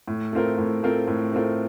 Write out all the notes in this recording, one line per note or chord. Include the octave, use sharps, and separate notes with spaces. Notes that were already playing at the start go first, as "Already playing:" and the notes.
A2
A3 C4 F4 A#4
A2
A3 C4 F4 A#4
A2
A3 C4 F4 A#4